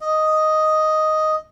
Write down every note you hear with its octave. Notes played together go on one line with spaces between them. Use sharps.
D#5